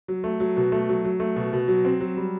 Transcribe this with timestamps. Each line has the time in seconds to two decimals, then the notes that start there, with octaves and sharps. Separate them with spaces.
0.08 F#3
0.24 A3
0.40 F#3
0.57 B2
0.72 A3
0.89 F#3
1.05 F#3
1.20 A3
1.36 B2
1.53 B2
1.68 F#3
1.85 C4
2.00 F#3
2.17 G3